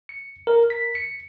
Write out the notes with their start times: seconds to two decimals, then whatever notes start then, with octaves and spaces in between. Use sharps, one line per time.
0.09 C#7
0.47 A#4
0.70 B6
0.95 C#7